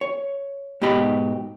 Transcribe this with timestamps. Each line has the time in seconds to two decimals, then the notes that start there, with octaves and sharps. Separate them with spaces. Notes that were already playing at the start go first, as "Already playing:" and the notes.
0.01 C#5
0.82 G#2 B2 G4 D#5 B5